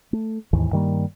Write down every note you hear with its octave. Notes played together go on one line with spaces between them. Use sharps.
A3
D#2 G#2 D#3 E3
G2 D#3 G3 A#3